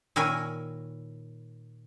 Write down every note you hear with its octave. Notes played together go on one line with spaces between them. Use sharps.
A#2 D#3 E4 A#4 C#5 G#5